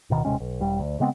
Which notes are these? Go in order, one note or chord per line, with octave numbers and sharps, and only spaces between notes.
D1 B2 D#3
D#1 C3 G#3 C#4
B1
E1 G3
D2
C#3 G#3 B3 C4